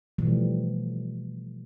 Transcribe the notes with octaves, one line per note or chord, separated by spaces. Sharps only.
B2 E3 F3 G3 A3